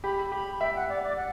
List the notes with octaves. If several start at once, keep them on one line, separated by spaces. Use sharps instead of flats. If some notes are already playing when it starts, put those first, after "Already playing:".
G4 B5
G4 B5
E5 G5
F#5
D5
D5
F#5